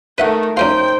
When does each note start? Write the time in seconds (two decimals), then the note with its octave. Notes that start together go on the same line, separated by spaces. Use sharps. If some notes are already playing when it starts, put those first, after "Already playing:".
0.18 D#3 A3 B4 E5 F#5
0.57 F#2 D#4 A#4 C5 F5 G5